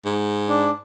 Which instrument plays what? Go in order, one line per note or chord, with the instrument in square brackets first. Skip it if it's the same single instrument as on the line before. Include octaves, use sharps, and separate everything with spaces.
[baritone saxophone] G#2
[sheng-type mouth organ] D4